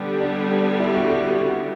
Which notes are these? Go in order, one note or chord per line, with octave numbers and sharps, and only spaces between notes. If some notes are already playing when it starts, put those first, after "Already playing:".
Already playing: D3 G3 B3 D4
D4
E4
F#4
G4
F#4
F#4